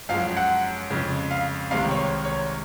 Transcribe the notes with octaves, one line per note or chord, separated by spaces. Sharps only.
F#2 F3 G#3 F5
F#5
F2 C#3 G#3
F5
C2 C3 D#3 G#3 F5
C#5
C#5